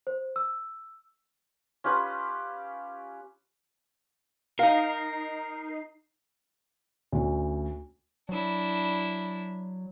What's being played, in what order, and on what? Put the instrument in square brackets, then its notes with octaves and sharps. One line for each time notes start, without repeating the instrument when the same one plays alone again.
[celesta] C5
E6
[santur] C#4 F4 G4 B4
[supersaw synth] D#4 C7 [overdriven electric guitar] A#4 [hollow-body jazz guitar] F5
[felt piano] D2 C#4
[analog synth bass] F#3 [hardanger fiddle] D4 E4